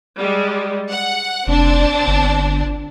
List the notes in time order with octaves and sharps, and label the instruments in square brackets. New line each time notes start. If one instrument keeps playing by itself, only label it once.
[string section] G3 G#3
F#5
[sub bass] F1 [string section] C4 D4
[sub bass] G1